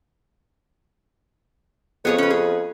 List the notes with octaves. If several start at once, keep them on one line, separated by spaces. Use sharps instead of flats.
F2 B3 G#4 C#5
C#4 B4
G#4